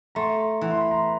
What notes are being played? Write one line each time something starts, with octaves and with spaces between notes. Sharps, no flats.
A3 A#5 C6
E3
C6
B5
A#5 C6